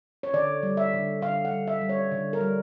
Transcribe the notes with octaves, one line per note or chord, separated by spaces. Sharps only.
C#5
D3 D5
G3
E5
D3
D3 F5
F#5
G3
E5
G3
C#5
D3
A#4
G3